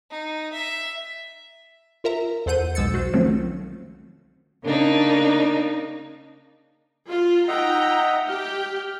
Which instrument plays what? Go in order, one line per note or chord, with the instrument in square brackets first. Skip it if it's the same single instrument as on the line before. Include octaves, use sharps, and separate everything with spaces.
[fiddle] D#4
E5
[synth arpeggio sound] F4 A#4 E5 A#5
E2 A4 C5 F#5 G6 D#7
B1 G#3 E6 A6 C#7
F#4 C5
D#3 F3 F#3 A3 C4 C#4
[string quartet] C#3 A#3 D4 D#4
[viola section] F4
[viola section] D#4 G5 A#5 [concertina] D#5 E5 F#5
[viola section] G4 G5 [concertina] F6